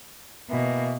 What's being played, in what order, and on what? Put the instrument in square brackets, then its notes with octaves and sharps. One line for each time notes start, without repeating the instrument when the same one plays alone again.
[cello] B2 A#3 [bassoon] E3